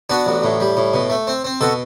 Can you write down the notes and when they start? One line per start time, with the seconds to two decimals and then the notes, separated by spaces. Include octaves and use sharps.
0.10 B3 D4 F#4
0.26 A1
0.44 A2
0.60 G3
0.77 A2
0.93 B2
1.10 A3
1.27 C4
1.44 C4
1.61 B2 F#4 A4